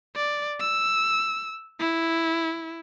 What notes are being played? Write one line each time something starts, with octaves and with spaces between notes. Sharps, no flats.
D5
E6
E4